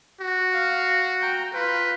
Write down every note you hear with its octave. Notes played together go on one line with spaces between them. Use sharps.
F#4
F5
G5 A#5
F4 B4